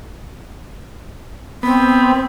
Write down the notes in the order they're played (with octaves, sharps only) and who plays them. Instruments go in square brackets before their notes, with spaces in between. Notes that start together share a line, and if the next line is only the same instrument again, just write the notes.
[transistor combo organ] B3 [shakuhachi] C4